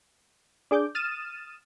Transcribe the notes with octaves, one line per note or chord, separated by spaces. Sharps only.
D4 G#4 D6 G6
D#6 F6 A6 D#7 E7